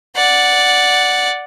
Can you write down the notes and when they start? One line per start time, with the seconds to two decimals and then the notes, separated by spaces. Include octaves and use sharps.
0.16 D5 F#5